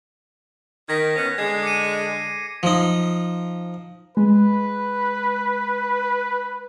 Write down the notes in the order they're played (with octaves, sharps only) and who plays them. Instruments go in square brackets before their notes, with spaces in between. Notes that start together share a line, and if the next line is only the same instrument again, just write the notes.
[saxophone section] D#3 [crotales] G#6 A#6 B6
[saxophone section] B3 C#4
[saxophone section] D3 G#3 [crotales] G#6 C7
[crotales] D6 C#7 D#7
[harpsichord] F3 D#4
[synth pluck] G#3 [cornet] B4